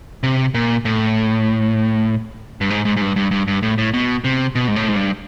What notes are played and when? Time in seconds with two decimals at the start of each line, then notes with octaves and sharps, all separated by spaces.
0.23 C3
0.54 A#2
0.85 A2
2.61 G2
2.70 G#2
2.85 G#2
2.96 G#2
3.01 G2
3.16 G2
3.31 G2
3.48 G2
3.63 A2
3.78 A2
3.94 B2
4.24 C3
4.55 B2
4.68 G#2
4.76 A2
4.88 G#2
4.96 G2